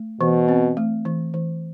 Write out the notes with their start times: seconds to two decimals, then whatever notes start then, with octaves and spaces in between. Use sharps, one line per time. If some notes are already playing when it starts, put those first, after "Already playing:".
Already playing: A3
0.21 B2 E3
0.48 C4
0.77 A3
1.05 E3
1.34 E3